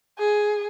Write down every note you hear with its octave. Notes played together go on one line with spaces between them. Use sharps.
G#4